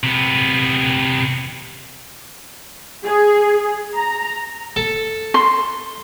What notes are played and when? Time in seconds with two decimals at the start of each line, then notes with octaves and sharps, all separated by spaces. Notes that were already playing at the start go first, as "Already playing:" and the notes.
0.03 C3 B3
3.04 G#4
3.96 A#5
4.76 A4
5.34 C6